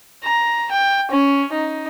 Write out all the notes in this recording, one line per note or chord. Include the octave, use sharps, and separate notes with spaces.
A#5
G5
C#4
D#4